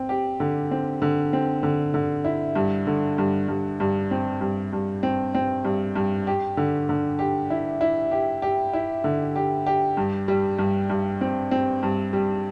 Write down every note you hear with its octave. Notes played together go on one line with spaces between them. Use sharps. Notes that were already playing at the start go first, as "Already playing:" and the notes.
Already playing: C4
G4
D3
C4
D3
C4
D3
D3
E4
G2
D3
G2
G2
G2
C4
G2
G2
C4
C4
G2
G2
G4
D3
D3
G4
E4
E4
G4
G4
E4
D3
G4
G4
G2
G3
G2
G2
C4
C4
G2
G3